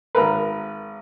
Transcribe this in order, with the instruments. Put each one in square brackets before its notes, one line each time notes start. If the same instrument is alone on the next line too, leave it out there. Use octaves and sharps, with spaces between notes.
[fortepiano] G#1 A#4 B4